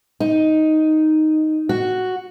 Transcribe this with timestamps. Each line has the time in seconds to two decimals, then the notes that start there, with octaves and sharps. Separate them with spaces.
0.20 D#4
1.69 F#4